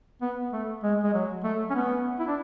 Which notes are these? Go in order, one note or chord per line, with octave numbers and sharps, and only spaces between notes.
B3
A3
G#3
G#3
F#3
A3
C#4
B3
E4
D4